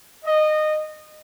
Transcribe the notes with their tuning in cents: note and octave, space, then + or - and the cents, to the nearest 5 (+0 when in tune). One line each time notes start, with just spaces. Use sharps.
D#5 -20